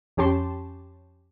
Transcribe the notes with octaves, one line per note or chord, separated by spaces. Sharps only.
F2 C#4 G4 A5 C6